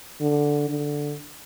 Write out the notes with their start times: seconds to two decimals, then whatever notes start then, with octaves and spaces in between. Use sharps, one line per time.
0.21 D3
0.69 D3